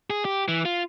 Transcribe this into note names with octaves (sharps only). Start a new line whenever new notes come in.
G#4
G4
E3
F4